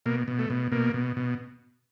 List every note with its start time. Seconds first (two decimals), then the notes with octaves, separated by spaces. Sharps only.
0.06 B2 A#3
0.28 B2
0.39 A3
0.50 B2
0.72 B2 A#3
0.94 B2
1.17 B2